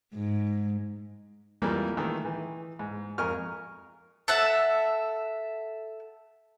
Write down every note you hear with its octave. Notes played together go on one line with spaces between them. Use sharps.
G#2
F2 E3 F3 G3 G#3 A#3
D#3 E3 A3 A4
E3
G#2
F2 A#4 G#5 C#6 F6
A4 E5 F#5 A5